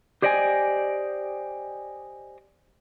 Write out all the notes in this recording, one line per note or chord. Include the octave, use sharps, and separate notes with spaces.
G4 C5 D5 D#5 G5 G#5